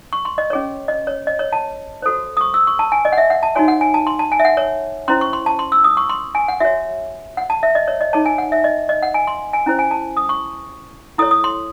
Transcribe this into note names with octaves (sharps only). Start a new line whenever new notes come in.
C#6
C6
D#5
C#4 G#4 C#5
D#5
C#5
D#5
C#5
A5
F#4 A4 C5
D#6
C#6
E6
C#6
A5
G#5
D#5
F#5
E5
F#5
A5
D#4 F#4 C#5 G#5
F#5
G#5
A5
C6
A5
G#5
E5
F#5
C#5
C#4 E4 C5 C6
C#6
C6
A5
C6
E6
D#6
C#6
C6
G#5
F#5
F#4 C#5 E5
F#5
A5
E5
D#5
C#5
D#5
D#4 G#4 C#5 A5
G#5
F#5
E5
D#5
D#5
F#5
G#5
C6
G#5
C#4 E4 C5
G#5
A5
D#6
C#6
E4 A4 C#5 D#6
D#6
C6